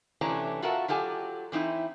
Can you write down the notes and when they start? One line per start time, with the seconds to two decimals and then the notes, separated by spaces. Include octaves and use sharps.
0.21 C3 E3 A3 C#4 D4 A#5
0.62 F4 F#4 A4 A#4 E5 F#5
0.88 F#3 F4 G4 A4 G#5
1.52 E3 C4 D#4 E4